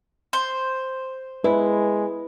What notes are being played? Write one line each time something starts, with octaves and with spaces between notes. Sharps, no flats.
C5
G#3 E4 B4